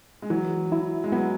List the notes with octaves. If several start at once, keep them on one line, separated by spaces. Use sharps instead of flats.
G#3
E3 F#3
E4
G#3
F#3 B3